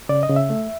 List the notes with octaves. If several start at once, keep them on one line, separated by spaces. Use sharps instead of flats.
C#3 D5
D#5
C#3
E5
A3